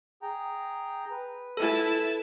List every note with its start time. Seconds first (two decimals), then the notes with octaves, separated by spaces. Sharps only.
0.22 G#4 G5 A#5
1.11 B4
1.57 E4 A4 A5